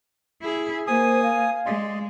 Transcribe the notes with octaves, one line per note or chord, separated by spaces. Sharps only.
E4 G#4
A#3 C5 G#5 D#6
F5
G#3 D5 D#5 C6